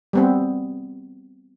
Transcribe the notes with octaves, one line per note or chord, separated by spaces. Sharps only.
G3 B3 C4